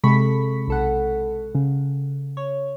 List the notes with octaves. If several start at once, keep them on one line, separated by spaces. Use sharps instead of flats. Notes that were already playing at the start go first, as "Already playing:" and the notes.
C3 G#3 A4 B5 C#6 B6
B1 A4 F#5
C#3
C#5